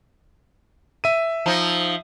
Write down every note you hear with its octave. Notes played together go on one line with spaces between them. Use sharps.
E5 D#7
F3 D#4